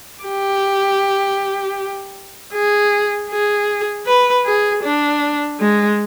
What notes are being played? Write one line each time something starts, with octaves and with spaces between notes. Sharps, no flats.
G4
G#4
G#4
B4
G#4
D4
G#3